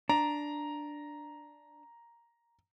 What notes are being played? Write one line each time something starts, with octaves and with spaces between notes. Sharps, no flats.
D4 A#5